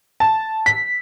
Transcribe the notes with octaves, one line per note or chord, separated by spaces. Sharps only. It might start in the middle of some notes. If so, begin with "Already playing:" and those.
A5
B6